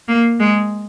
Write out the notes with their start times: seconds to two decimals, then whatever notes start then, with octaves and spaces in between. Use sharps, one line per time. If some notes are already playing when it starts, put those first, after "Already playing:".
0.08 A#3
0.40 G#3